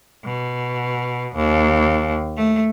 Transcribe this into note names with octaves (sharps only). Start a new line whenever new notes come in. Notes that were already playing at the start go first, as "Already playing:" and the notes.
B2
D#2
A3